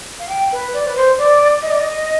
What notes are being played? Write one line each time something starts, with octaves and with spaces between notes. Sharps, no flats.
F5
G5
B4
D5
B4
C5
D5
D#5
D5
D#5